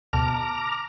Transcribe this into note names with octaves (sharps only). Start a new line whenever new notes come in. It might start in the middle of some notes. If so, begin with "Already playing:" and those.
D2 B2 A5 A#5 D6 F6